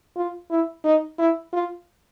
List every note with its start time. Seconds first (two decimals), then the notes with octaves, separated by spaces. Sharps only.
0.16 F4
0.50 E4
0.85 D#4
1.19 E4
1.53 F4